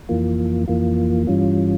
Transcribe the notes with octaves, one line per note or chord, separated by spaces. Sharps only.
F2 E3 A#3 F4
F2 E3 A#3 F4
G2 E3 G3 C#4 F4